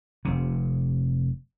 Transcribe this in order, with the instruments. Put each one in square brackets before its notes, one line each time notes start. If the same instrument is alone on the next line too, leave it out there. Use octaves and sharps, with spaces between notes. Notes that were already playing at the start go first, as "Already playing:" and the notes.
[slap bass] F1 C3